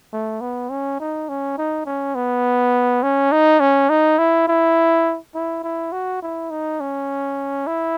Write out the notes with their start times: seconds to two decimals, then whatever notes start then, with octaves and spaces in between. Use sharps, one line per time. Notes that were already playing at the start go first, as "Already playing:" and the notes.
0.13 A3
0.41 B3
0.70 C#4
1.00 D#4
1.29 C#4
1.58 D#4
1.86 C#4
2.15 B3
3.03 C#4
3.32 D#4
3.60 C#4
3.90 D#4
4.18 E4
4.48 E4
5.35 E4
5.64 E4
5.92 F#4
6.22 E4
6.50 D#4
6.80 C#4
7.67 E4